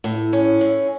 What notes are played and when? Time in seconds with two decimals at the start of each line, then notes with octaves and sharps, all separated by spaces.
0.04 A2
0.33 C#4
0.61 A2